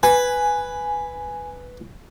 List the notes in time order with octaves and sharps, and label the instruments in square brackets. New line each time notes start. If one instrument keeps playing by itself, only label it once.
[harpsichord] B4 [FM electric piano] G#5